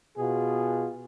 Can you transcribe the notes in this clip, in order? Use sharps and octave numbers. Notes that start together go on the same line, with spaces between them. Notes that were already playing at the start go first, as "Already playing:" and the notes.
B2 F4 F#4 G#4